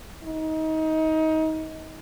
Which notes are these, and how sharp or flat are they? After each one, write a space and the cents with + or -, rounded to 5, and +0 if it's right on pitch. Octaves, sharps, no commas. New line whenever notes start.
D#4 +25